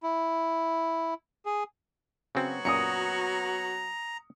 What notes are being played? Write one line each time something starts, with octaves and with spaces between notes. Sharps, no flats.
E4
G#4
C#3 F#3 B3 C4 F#4
F#2 A#2 A#5 D#6 C#7